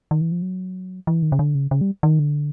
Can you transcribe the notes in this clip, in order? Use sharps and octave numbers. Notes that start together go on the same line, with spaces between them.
D#3
E3
F3
F#3
E3
D#3
C#3
D3
C#3
C#3
G3
D#3
D3